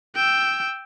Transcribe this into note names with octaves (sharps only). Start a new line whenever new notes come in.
G5 E6